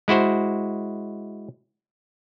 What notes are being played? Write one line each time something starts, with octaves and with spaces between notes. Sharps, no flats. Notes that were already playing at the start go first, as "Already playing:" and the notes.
G#3 E4 F#4 C5